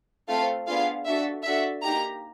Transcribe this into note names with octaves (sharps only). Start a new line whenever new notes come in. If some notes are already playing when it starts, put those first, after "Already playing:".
A3 C4 F4 A4 F5
B3 D4 F4 G#4 F5
D4 F#4 A4 E5
D4 F#4 A4 E5
A#3 D#4 G4 A#5